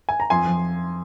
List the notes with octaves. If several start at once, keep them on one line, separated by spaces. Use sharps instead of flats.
G#5
A#5
F2 G#5 C6
F3